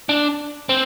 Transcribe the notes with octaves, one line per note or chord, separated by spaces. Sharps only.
D4
C4